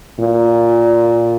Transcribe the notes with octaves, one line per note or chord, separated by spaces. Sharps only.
A#2